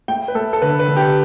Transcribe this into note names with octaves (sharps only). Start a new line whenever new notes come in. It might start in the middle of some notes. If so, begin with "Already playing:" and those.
A3 G5
B4
A3 A4
A4
D3 B4
B4
D3
G4